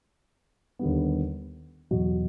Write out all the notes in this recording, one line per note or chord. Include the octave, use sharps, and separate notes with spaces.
D#2 D3 G3 B3
E2 B2 F#3